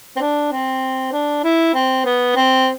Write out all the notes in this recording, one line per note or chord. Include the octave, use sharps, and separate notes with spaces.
C4
D4
C4
D4
E4
C4
B3
C4